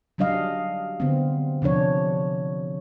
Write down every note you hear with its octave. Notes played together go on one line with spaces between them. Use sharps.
F#3 G3 D4 D#5 F5
D3 B3 C4
C3 F3 D4 C#5